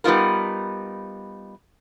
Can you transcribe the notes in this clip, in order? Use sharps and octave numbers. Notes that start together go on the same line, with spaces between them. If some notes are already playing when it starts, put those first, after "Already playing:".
G3 B3 D#4 F4 A#4